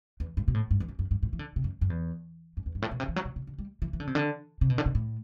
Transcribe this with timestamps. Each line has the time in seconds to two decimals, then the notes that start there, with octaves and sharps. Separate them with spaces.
0.20 E2
0.37 G2
0.48 B2
0.54 A2
0.71 G2
0.80 E2
0.88 F#2
0.99 F#2
1.11 G2
1.23 A2
1.33 E3
1.39 D3
1.56 C3
1.64 F#2
1.81 F#2
1.90 E2
2.57 F#2
2.66 E2
2.75 G2
2.82 A2
2.91 B2
3.00 C3
3.08 E3
3.16 F#3
3.25 B2
3.36 C3
3.47 D3
3.58 G3
3.82 E3
3.93 E3
4.00 D3
4.07 C3
4.15 D3
4.61 C3
4.70 B2
4.78 D3
4.86 C3
4.95 A2